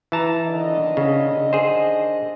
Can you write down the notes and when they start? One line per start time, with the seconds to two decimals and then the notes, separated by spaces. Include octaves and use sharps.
0.12 E3 A5 A#5
0.45 D3 D#3 D#5
0.97 C#3
1.53 G#4 C5